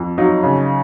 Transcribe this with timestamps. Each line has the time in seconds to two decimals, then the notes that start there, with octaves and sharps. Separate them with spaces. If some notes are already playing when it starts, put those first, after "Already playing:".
Already playing: F2
0.18 F#3 D#4 F4
0.43 C#3